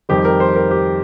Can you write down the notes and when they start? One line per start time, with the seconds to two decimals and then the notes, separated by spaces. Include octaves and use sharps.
0.09 F2 D#3 G3 G4
0.25 A#4
0.40 C5
0.55 A#4
0.71 G4